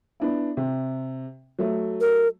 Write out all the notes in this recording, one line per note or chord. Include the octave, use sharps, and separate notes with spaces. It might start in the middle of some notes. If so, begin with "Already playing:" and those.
B3 D4 E4
C3
F#3 A3
A#4